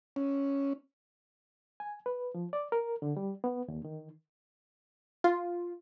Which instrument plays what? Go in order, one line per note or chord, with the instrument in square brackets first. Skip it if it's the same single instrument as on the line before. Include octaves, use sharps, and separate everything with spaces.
[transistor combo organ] C#4
[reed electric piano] G#5
B4
F3
D5
A#4
D3
G3
B3
D#2
D#3
[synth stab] F4